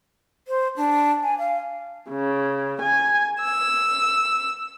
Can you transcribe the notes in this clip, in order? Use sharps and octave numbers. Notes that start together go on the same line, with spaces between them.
C5
D4
G#5
F5
C#3
G#5
E6